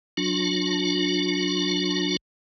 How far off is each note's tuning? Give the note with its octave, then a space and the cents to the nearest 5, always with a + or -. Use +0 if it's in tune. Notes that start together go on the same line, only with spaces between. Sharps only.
F#3 -10 D4 +0 F4 +45